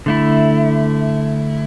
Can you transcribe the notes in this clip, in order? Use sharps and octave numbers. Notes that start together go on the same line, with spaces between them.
D3 A3 E4